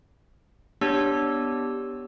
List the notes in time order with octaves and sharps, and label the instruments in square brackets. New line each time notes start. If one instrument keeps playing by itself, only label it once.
[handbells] B3 D4 G4 C#5 E6